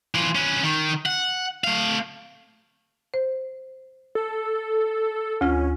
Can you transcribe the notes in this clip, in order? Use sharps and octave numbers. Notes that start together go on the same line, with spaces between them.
E3 F4
C#4 B4
D#3
F#5
A3 F5
C5
A4
D2 C#4 F4